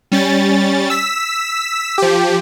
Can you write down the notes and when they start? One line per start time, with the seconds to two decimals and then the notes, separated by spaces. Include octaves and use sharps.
0.12 G3 C#4 A6
0.90 E6 B6
1.98 F3 G4